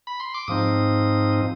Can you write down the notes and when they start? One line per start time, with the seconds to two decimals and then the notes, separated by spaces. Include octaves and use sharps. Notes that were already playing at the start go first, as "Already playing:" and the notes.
0.07 B5
0.20 C6
0.34 D6
0.48 G#2 F3 C4 D#4 D#6